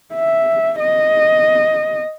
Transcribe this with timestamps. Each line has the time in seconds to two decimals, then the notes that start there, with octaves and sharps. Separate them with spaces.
0.14 E5
0.80 D#5